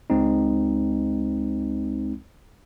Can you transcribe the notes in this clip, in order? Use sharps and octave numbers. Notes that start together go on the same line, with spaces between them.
C#2 G#3 C4 D#4